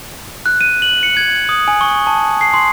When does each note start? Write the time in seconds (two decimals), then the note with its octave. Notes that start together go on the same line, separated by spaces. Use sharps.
0.46 F#6
0.61 D#7
0.82 F#7
1.03 C#7
1.17 G#6
1.49 D#6
1.68 G#5
1.81 C#6
2.07 A5
2.41 C7
2.54 C6